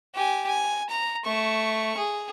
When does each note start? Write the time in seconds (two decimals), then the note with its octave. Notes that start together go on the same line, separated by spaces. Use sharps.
0.15 G4 G#5
0.47 G#5
0.89 A#5
1.25 A3 C#6
1.97 G#4